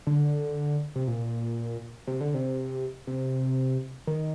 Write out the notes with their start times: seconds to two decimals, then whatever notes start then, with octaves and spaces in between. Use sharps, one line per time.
0.07 D3
0.96 C3
1.07 A#2
2.07 C3
2.21 D3
2.34 C3
3.07 C3
4.07 D#3